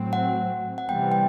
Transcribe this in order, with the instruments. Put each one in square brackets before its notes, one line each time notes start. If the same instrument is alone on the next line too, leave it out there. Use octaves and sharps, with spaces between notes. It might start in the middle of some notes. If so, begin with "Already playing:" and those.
Already playing: [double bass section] A2 F#3 C4
[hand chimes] F#5
F#5
[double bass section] C3 E3 G3 B3 [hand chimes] G5
[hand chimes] G5